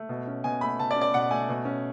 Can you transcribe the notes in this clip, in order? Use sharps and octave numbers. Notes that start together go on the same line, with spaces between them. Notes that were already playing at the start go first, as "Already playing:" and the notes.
Already playing: A3
B2
C#4
B2 G#5
A3 B5
B2 A5
D5
C#4
D5
B2 F#5
A3 G#5
B2
C#4